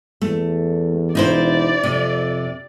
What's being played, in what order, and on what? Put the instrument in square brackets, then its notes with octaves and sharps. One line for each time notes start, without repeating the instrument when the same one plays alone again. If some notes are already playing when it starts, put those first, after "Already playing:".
[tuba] E2 [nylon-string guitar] A3
[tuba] E1 [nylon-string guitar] D#4 E4 C5 [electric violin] D5
[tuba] F2 [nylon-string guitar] C3